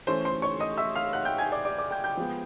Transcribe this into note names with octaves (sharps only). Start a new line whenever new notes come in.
E3 A3 C#4 C5 C6
C5 C6
C#5 C#6
D#5 D#6
E5 E6
F5 F6
F#5 F#6
G5 G6
G#5 G#6
D5 D6
D5 D6
D5 D6
G5 G6
G5 G6
F3 G#3 B3